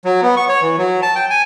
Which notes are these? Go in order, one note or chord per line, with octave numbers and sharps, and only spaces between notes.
F#3
B3
C#6
C#5
E3
F#3
A5
G5
G#5